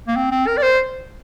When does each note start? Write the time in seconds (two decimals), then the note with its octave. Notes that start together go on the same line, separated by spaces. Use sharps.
0.07 A#3
0.16 C4
0.31 C4
0.47 A#4
0.57 D5
0.62 C5